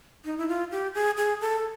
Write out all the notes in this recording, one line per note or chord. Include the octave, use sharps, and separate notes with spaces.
D#4
E4
F4
G4
G#4
G#4
A4